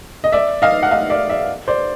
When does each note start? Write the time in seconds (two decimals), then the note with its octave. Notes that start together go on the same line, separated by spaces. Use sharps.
0.24 D#5
0.32 D5 E5
0.62 D#5 F5
0.83 F#5
0.91 D#5 F5
1.10 D5 E5
1.30 D5 E5
1.68 C5 D5